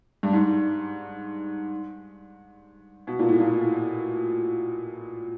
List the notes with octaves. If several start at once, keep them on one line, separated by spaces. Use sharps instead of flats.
G2
G#2
B2
A#2
A2
A#2